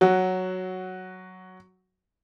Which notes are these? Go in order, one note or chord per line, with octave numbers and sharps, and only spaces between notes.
F#3 F#4